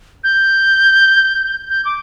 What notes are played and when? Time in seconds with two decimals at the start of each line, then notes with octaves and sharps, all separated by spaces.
0.24 G6
1.69 G6
1.85 D6